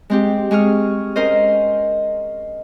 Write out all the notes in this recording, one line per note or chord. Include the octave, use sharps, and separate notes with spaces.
G#3 C4 G4
G#3 G#4 C#6 F6
C#4 A#4 C5 D#5